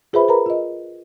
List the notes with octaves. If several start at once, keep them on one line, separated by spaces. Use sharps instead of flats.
F4 G#4 B4 C5 E5 B5
A#4 B4 A#5 B5
F4 D#5